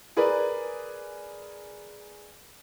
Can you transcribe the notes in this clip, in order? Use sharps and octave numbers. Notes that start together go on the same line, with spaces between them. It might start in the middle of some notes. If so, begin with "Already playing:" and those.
G#4 A#4 B4 D5